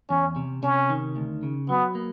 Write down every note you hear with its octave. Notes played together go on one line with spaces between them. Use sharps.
E2 C#4
C3
C3 C#4
D#3
D2
C#3
F#3 B3
A#3